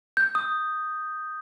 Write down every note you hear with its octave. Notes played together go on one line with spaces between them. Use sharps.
G6
D#6